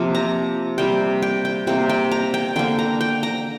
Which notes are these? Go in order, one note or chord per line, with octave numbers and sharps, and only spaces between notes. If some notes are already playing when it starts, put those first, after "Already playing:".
Already playing: C3 F3 A#3
A#5
C3 G3 A#3 G5
G5
G5
C3 A#3 G5
G5
A#5
G5
D3 A#3 G5
A#5
G5
A#5